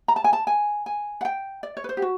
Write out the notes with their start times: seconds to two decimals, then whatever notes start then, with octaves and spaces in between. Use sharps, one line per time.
0.08 A#5
0.16 A5
0.24 G#5
0.33 A5
0.47 G#5
0.86 G#5
1.21 F#5
1.25 G5
1.63 D5
1.77 C#5
1.84 B4
1.89 C5
1.97 G4
2.02 F#4